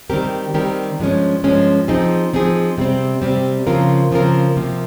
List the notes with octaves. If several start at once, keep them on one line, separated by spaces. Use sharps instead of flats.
D#3 G3 C4 G4 A#4
D#3 G3 C4 G4 A#4
G2 F3 G#3 C#4
G2 F3 G#3 C#4
F3 C4 D#4 G#4
F3 C4 D#4 G#4
C3 G3 C4
C3 G3 C4
C#3 F3 C4 F4 A#4
C#3 F3 C4 F4 A#4
C3 F3 A#3